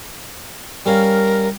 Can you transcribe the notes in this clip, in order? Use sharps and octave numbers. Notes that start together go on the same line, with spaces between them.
G3 C#4 A#4 F5